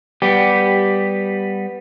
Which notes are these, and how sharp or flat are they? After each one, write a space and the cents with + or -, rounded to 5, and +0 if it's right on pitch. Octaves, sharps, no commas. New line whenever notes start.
G3 +0 B3 +0 G4 -5